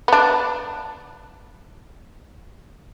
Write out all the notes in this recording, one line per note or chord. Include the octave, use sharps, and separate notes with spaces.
B3 D4